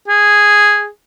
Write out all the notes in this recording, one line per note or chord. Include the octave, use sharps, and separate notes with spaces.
G#4